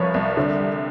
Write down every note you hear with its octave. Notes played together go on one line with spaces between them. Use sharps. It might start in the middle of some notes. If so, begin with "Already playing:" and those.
Already playing: C2 F3 B4 C#5
C2
D3
G3